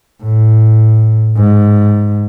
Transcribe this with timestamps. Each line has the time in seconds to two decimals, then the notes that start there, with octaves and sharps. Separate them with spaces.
0.23 A2
1.37 G#2